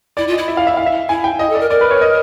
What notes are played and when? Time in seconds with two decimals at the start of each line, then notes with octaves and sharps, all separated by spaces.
0.17 E4 D5
0.28 F4
0.33 D#5
0.38 E4
0.48 E5
0.57 F5
0.67 E5
0.77 F5
0.86 E5
1.09 E4 G#5
1.24 G5
1.39 E4 D#5
1.50 A4
1.55 D5
1.60 A#4
1.70 A#4 D5
1.81 B4
1.91 C#5
2.01 D#5